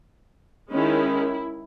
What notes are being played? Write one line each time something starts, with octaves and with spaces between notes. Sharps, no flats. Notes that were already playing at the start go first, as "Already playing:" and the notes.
D#3 G#3 C#4 E4